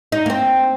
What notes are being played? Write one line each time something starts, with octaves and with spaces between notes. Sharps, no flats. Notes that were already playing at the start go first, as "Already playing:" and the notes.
D#4
A#3
C4